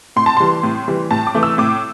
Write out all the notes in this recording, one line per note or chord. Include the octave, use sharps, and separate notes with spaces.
A2 C6
A5
E3 G3 C6
A2
E3 G3
A2 A5
D6
E3 A3
E6
A2 D6